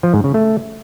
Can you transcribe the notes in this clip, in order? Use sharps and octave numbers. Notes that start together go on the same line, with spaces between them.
F3
G#2
C#3
A3